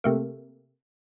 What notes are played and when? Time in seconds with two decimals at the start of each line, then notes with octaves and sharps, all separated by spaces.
0.04 C3 A3 A#3